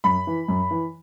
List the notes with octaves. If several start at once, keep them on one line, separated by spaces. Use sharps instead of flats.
F#2 B5
E3
F#2
E3